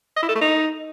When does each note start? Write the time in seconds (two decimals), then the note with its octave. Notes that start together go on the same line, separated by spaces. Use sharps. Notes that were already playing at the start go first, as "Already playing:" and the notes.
0.16 D#5
0.23 E4
0.29 A4
0.35 A3
0.41 D#4